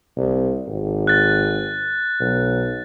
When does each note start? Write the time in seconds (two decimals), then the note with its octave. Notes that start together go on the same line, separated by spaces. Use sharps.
0.17 C2
0.67 G#1
1.07 F#6 A6
2.21 B1